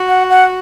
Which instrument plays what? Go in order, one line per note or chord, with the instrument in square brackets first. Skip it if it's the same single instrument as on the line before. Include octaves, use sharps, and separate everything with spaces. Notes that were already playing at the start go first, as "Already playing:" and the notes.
Already playing: [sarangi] F#4
[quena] F#5
F#5